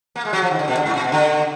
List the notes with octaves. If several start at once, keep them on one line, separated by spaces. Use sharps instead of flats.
A#3
G#3
F#3
F3
D#3
D3
B2
D3
G#2
A#2
B2
D3